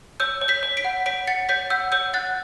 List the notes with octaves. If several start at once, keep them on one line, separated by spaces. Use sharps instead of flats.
C#5 E6 G6
C#5
G6 B6
C#5
B6 D7
F#5
C#5 B6 D7
F#5 A6 C#7
C#5 G6 B6
F#5 E6 G6
C#5 E6 G6
F#5 F#6 A6